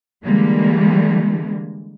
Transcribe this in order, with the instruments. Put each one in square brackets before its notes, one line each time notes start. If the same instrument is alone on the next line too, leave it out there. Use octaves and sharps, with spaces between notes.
[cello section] D3 E3 G3 G#3 A#3